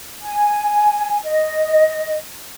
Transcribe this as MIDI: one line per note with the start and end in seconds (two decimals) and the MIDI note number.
0.21 1.18 80
1.24 2.17 75